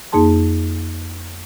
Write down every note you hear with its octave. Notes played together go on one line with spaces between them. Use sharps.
F2 A#3 D#4 G#4 A5 C6